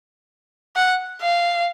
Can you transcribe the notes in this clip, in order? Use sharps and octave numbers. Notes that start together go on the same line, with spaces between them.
F#5
F5